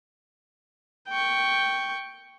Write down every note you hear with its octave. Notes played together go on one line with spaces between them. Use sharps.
G5 C#6